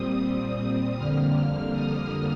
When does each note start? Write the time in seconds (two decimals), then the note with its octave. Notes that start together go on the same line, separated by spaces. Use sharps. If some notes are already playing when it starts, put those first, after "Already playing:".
Already playing: A#2 G3 C4 D#6
0.21 D#6
0.97 F2 D3 G3 A#3 F6
1.72 D#6